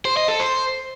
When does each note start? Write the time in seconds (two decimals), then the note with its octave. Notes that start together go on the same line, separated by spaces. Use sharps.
0.05 C5
0.17 D#5
0.28 A4
0.40 C5